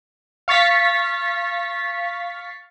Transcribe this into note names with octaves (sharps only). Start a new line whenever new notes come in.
F5 C#6 A6 B6